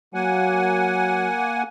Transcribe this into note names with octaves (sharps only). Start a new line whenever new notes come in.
F#3 A#3 F#5 G#5